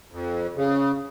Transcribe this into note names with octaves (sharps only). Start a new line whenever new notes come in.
F2
C#3